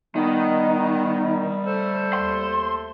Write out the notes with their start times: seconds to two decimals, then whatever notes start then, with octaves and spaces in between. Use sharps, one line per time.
0.16 D#3 G3 B3 D#4
1.64 A3 A4 C5
2.14 D#2 C6